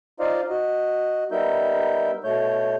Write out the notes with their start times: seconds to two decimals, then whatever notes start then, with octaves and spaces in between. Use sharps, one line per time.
0.20 D#4 F4 C5 D5 D#5 F5
0.49 F#4 D#5
1.32 G3 B3 D#4 A#4 E5 G6
2.24 B2 A3 C#5 G6